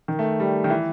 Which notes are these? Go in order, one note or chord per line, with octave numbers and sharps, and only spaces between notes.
D#3
A3
G3
D#3
E3